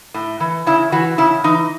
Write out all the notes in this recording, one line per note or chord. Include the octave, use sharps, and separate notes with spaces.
A2
E3
C#3 E4
E3 F#4
C#3 E4
E3 D#4